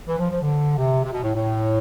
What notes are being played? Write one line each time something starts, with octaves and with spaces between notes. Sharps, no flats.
E3
F3
F3
D3
C3
C3
B2
A2
A2